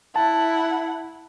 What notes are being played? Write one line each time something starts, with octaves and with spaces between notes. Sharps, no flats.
E4 F#5 A5